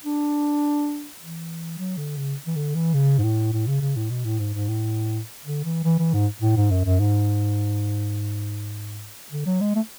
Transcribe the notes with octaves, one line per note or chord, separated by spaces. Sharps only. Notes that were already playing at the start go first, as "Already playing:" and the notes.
D4
E3
F#3
D3
C#3
E3
D3
E3
C#3
G#2
A2
A2
C#3
C#3
A2
B2
A2
G#2
G#2
A2
D3
E3
E3
E3
G#2
A2
G#2
F#2
F#2
G#2
D3
F#3
G#3
A3